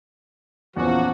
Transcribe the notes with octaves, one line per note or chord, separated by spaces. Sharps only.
E2 A#2 F3 C#4 F#4